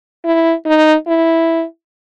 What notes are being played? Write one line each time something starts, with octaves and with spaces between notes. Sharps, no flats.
E4
D#4
E4